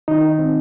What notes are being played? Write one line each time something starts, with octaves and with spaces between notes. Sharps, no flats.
D#3 D#4
C4